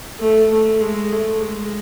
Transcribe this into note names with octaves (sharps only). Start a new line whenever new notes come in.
A3
A3
G#3
A3
G#3